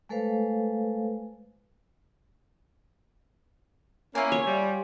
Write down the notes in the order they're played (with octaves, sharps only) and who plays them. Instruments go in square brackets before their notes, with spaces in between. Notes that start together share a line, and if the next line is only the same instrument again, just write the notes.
[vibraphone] G#3 A3 A4 B4 C5 F5
[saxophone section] A#3 C#4 E4 [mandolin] F4 G#5
[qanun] C#5
[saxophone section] G3